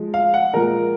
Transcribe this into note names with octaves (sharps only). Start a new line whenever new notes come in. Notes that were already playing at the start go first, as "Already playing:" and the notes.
Already playing: F3 G#3
F5
F#5
A#2 F3 G#3 A#4